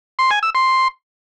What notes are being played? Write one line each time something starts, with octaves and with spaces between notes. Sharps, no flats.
C6
G#5
E6
C6